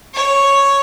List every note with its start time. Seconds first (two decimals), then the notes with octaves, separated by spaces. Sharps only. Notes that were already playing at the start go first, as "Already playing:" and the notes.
0.14 C#5